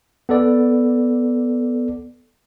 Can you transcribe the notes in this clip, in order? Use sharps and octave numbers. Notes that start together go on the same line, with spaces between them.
B3 A4 D5